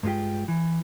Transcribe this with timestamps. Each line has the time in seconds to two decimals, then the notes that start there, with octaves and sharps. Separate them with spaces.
0.03 G2 G#3 F4 G4
0.48 E3